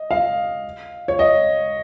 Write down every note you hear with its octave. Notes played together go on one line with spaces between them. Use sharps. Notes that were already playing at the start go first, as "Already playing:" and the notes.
Already playing: D#5
F5
C#5
D#5